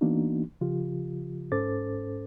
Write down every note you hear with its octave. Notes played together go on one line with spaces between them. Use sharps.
E3 A#3 B3 D4 D#4 F#4
C#3 F3 F4 G4
G#2 C#4 A4 C5 D6 A6